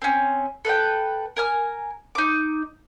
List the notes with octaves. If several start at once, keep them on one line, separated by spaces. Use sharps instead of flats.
C4 C#4
A4 B4 F5 G5
A#4 G#5 F6
D#4 D6